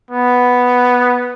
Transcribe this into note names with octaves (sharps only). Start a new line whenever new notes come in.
B3